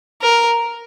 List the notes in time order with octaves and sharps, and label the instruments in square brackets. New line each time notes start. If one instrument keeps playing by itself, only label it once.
[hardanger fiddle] A#4